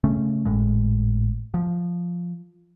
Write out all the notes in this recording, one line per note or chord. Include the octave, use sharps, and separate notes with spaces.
C#3 A3 C#4
G#1 A2 G#3
F3